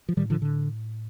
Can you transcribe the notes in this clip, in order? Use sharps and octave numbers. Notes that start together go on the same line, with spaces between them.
F3
A2 D#3 G3
D3 F3
D3